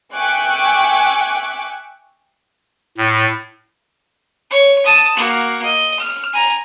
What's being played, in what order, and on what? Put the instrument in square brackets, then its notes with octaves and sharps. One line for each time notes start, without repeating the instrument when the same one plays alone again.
[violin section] E5 G5 G#5 C#6 D6 F#6
[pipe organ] A2
[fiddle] C#5
A5 D#6
A#3 F#4
D#5
F6
G#5 A#5